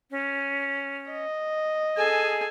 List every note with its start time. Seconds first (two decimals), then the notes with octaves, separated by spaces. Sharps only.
0.11 C#4
1.10 D#5
1.97 G#4 A4 G#5